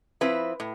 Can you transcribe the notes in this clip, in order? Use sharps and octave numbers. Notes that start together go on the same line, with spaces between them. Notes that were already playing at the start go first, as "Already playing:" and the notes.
F3 C4 E4 B4
A2